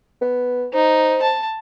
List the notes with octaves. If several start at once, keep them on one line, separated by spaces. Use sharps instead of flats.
B3
D#4 C5
A5